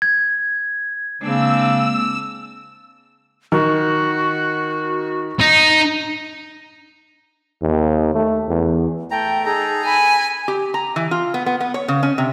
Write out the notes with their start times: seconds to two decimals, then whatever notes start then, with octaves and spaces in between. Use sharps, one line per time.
0.02 G#6
1.21 C#3 G#3 A#3 C4 D4 E6
3.52 D#3 F#4
5.40 D#4
7.62 D#2
8.15 A3
8.49 E2
9.11 A3 G5 A#5
9.45 D#4 G#4 A4 A#5
9.86 G#5 B5
10.48 G4
10.74 A#5
10.96 E3
11.11 F4
11.34 B3
11.46 B3
11.60 B3
11.74 C#5
11.88 C#3
12.03 C#4
12.18 C3